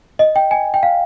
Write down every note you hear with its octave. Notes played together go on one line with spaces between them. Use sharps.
D#5
G5
G#5
G5
F5